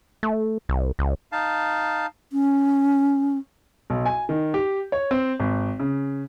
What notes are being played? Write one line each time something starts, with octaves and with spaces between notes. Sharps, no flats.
A3
C2
C#2
D#4 F5 A5
C#4
B1
G#5
D#3
G4
C#5
C4
G#1
C#3